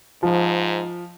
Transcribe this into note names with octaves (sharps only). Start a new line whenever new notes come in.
G#2 F3